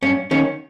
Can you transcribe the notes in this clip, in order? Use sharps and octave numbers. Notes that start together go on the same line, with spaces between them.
G2 C#4
D#3 C#4